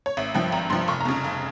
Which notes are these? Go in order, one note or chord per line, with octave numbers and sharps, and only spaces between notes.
C#5
G#1 E5
G2 F3 G5
G#1 A#5
G2 F3 C6
F1 C#6
A#5
F2 C#3
F1